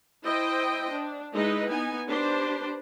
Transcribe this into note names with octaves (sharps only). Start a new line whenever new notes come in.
E4 C5 D#5 G5
D4
G#3 D#4 E4 B4 D#5
B3 D#4 G#5
D4 G4 B4 C5